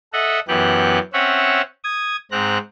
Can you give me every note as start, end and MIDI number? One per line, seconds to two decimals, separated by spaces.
0.13 0.40 69
0.13 0.40 75
0.13 0.40 76
0.13 0.40 78
0.48 0.99 42
0.48 0.99 52
0.48 0.99 59
0.48 0.99 67
0.48 0.99 90
1.13 1.62 60
1.13 1.62 61
1.13 1.62 73
1.13 1.62 76
1.13 1.62 78
1.84 2.16 87
1.84 2.16 92
2.31 2.58 44
2.31 2.58 60
2.31 2.58 82
2.31 2.58 90